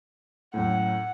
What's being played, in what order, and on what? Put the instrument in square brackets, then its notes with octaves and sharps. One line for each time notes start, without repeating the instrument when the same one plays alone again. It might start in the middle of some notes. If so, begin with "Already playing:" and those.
[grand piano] F#2 A2 [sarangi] F#5